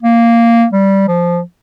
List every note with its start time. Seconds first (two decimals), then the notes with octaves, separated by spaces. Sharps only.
0.03 A#3
0.73 G3
1.08 F3